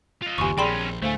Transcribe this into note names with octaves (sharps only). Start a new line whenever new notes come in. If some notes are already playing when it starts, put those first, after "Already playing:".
F4 D#5
F#1 D#2 D#3 G4 G#5 C#6
A#1 C4 C#4 G#4 D5 G5 B5 C6
D2 A2 A3 C5 F5 G#5